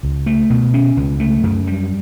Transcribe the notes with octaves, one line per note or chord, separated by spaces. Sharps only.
C#2
A3
B2
C#4
C#2
A3
F#2
G3